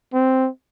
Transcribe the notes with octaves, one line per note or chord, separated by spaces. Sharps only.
C4